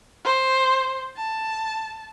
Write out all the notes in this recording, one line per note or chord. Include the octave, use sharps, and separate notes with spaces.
C5
A5